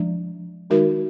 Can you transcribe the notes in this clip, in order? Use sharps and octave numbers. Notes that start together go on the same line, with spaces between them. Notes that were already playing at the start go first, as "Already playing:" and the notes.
Already playing: F3 G#3 D4
D#3 G#3 D#4 F#4 A#4